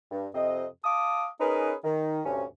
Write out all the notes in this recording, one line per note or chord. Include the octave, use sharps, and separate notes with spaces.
G2
F2 C3 C4 D#5
F5 A5 D6 D#6
C#4 D#4 G#4 A#4 B4
D#3
D2 G2 C3 C#4